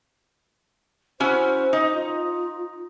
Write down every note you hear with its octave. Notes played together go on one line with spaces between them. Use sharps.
C#4 E4 F#4 C5
D#4
F4